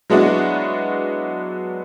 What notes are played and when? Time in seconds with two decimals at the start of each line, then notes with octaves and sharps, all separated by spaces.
0.10 F#3 G#3 B3 D4 E4 F#4